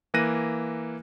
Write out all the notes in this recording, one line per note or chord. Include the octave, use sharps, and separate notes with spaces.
E3 A#3 F#6 A#6 D#7